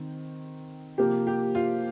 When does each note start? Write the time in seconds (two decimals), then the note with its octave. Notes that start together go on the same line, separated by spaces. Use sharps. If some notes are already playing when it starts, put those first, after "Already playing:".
Already playing: D#3 C4
0.98 C3 F3 A#3 G4
1.27 G4
1.55 F4